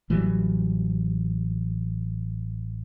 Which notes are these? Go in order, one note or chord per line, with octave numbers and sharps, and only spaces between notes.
A1 E3 F#3 G3